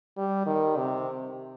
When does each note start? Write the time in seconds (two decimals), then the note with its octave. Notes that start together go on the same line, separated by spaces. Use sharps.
0.18 G3
0.46 D#3
0.77 C3